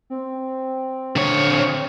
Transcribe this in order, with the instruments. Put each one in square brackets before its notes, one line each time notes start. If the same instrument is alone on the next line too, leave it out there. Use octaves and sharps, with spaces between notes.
[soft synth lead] C4
[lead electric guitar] D3 C#5